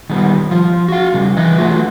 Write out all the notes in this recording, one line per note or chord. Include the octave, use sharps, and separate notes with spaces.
D#3 G3 B3
F3 F4
F#4 F5
C#3 G3
E3 B4 D#5
E3 F#3 A3 F4 F#4